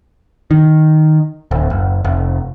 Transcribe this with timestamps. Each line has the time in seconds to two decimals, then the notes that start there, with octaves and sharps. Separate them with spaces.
0.51 D#3
1.51 D1
1.70 F#1
2.04 F1